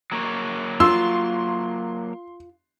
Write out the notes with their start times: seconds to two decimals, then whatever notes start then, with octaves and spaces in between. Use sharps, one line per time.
0.12 F#3 A#3 C#5
0.80 F4 C6 E6